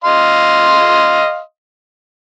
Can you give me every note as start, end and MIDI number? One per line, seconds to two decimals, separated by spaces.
0.04 1.39 75
0.04 1.39 77
0.04 1.39 84